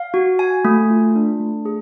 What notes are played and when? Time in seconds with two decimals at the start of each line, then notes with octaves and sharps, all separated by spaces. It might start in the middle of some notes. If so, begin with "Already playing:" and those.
Already playing: F5
0.14 F#4
0.39 G#5
0.65 A3
0.90 F4
1.15 D4
1.40 A3
1.65 G#4